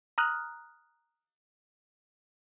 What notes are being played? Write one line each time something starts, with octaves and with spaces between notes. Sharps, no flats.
A#5 D#6 F6 F#6